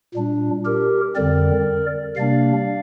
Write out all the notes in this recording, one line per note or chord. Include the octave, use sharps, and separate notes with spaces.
A#2 G3 D4
G4 A#4
F2 D3 G3 C4 A#4 D5
C3 G3 A#3 D4 D5 F5